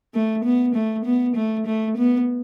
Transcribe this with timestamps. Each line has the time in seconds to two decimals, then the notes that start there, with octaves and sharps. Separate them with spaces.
0.14 A3
0.44 B3
0.75 A3
1.05 B3
1.36 A3
1.67 A3
1.97 B3